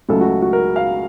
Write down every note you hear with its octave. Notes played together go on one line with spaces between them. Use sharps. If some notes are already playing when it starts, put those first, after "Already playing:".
C#2 C#3 F#3 A3 A4
F#4
F#4
A#4
F5